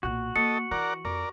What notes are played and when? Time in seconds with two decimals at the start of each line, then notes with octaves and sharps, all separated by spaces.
0.03 B1 A#2 F#4
0.36 A#3 A4 D#5 C#7
0.71 E3 A#4 D5 F#5
1.05 F2 A#4 D5